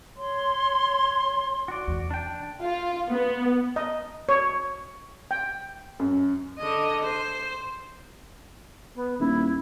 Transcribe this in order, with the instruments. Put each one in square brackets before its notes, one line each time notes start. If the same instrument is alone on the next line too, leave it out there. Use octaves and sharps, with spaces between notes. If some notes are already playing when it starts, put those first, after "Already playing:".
[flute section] C#5 C6
[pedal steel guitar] F#4 D5
[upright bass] E2 C3
[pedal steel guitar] D4 G5
[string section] F4
B3
[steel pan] D#5
C#5
G5
[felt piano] F#2
[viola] D3 D#5
C5
[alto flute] B3
[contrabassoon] D#1 [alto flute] E4